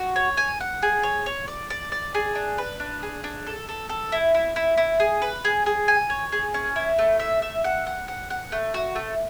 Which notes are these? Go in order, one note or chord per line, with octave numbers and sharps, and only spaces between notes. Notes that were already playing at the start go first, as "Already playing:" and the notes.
Already playing: F#4
C#5
G#5
F#5
G#4
C#5
C#5
D5
D5
D5
G#4
D4
B4
D4
G#4
D4
A4
A4
A4
E4
E4
E4
E4
G#4
B4
G#4
G#4
G#5
C#5
G#4
C#4
E4
A3
E5
E5
F#5
F#5
F#5
F#5
A3
F#4
A3